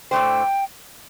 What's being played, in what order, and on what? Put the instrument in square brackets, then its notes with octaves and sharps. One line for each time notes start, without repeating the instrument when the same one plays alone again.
[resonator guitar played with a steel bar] A2 A3 D4 C5 [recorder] G5